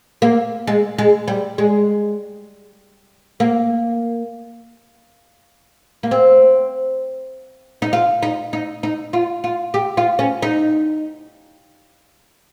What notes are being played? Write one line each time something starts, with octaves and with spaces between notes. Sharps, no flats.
A#3
G#3
G#3
G3
G#3
A#3
A#3
C4
D#4
F4
D#4
D#4
D#4
F4
F4
G4
F4
C#4
D#4